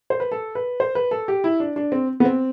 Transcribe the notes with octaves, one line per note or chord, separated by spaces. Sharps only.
C5
B4
A4
B4
C5
B4
A4
G4
E4
D4
D4
C4
B3
C4